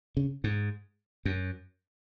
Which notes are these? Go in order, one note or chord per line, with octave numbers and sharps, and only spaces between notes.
C#3
G#2
F#2